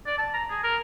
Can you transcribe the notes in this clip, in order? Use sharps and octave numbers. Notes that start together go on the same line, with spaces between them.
D5
A5
A#5
G#4
A#4